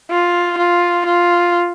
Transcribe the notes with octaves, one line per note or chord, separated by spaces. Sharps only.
F4
F4
F4